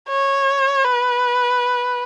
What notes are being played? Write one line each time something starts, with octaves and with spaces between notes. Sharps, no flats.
C#5
B4